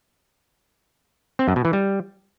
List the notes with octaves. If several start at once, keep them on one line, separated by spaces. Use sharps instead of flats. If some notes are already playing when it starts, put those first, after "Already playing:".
C4
F#2
B2
E3
G3